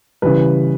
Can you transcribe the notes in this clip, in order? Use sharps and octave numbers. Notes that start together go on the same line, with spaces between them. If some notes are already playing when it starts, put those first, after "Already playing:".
C#3 E3 G3 B4